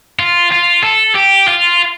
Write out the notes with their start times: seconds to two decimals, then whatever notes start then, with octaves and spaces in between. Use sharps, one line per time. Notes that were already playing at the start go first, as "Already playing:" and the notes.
0.19 F4
0.52 F4
0.84 A4
1.15 G4
1.48 F4